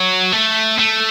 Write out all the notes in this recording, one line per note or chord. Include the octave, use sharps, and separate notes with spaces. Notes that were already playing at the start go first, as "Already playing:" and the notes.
Already playing: F#3
A3
A3